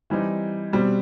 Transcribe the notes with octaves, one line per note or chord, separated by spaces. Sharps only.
E3 G3 C4 D#4
B2 G3 C4